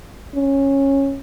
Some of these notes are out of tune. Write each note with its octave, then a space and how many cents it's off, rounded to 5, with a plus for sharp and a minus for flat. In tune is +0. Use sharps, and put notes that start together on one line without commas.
C#4 -15